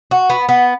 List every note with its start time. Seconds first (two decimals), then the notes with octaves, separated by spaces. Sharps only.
0.11 F#4
0.30 B3
0.49 B3